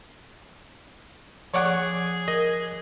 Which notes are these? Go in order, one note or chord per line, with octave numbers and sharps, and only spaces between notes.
F3 G#4 C#5 D5 F#5
A#4 D#5